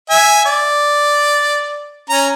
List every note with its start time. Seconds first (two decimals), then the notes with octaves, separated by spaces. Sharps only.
0.10 E5 G#5
0.45 D5
2.10 C#4 A#5